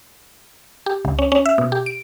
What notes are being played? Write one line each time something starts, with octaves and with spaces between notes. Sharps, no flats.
G4
C#2
C#4
C#4
E5
B2
G4
D7